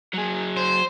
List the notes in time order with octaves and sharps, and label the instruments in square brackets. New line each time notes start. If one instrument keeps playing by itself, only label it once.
[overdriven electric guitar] F#3 G#4
[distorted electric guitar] C5